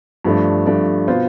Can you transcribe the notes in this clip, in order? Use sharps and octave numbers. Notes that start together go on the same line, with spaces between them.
G2 F3 A3 D4
G2 F3 A3 D4
B2 B3 F4 C5